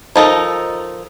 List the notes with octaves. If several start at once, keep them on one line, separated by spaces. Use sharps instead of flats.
F3 D#4 A4 A#4